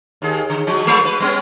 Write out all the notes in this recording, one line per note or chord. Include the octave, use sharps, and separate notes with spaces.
D#2 G#4
D3
F3 G#3 F#4
G#3 A#3 C4
B4
G3 B3 C#4